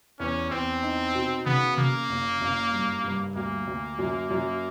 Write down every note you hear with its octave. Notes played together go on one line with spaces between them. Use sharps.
E2 C#4
E2 C4
D#4
B2
C#3 B3
C#3 A#3
F#1
F#1
G2
G2
D2 A#3
D2
F#2
F#2